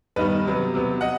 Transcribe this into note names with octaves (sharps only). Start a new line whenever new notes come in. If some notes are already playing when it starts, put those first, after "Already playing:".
G2 D#3 G3 B3 B4 D#5
C3 F#3 B3
C3 F#3 B3
D#5 F#5